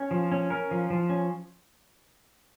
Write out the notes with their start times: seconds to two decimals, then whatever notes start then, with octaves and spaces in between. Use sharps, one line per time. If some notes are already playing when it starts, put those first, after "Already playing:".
Already playing: C#4
0.11 F3
0.32 C#4
0.50 C#4 A#4
0.71 F3
0.90 F3
1.09 C#4